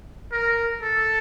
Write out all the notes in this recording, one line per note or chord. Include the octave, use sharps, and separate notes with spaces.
A#4
A4